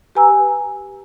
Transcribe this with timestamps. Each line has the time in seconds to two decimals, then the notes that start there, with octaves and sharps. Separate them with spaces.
0.15 G4 B4 G#5 A#5 E6